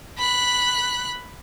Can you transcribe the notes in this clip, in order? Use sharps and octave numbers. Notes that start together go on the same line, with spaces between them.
B5 F#6